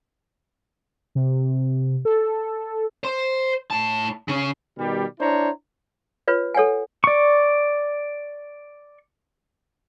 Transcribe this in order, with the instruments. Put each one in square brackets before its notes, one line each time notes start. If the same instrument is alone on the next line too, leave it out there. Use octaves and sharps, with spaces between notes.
[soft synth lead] C3
A4
[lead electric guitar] C5 C6
A2 A5
C#3 C#4
[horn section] B2 D#3 G3
D4 E4 C5 C#5 A#5
[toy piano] F4 B4 C#5
A4 C#5 F#5 G#5
[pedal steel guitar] D5 C#6